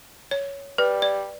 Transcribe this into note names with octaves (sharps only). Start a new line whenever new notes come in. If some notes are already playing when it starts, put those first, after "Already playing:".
C#5
G3 B4
D5